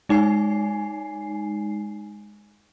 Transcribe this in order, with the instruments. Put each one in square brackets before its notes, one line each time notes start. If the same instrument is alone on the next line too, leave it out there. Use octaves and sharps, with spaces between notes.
[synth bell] G#3 D#4 G#5 C7